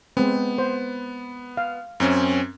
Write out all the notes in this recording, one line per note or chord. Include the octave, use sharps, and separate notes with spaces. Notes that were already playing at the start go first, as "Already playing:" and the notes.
G#3 B3 C4
C5
F5
F#2 C4 C#4